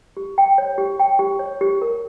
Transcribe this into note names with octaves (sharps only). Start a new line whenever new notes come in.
G4
G5
C#5
G4
G5
G4
C#5
G4
A#4